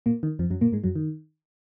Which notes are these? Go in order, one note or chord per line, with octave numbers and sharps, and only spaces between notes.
A#2 A#3
D#3
F2 F3
F#2 F#3
A#2 A#3
G#2 G#3
F#2 F#3
D#3